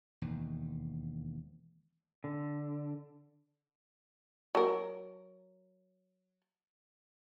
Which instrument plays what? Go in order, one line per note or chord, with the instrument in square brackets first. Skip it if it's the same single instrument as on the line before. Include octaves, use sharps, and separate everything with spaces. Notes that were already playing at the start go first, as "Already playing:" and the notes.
[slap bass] E1 D#2
[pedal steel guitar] D3
[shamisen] F#3 A#4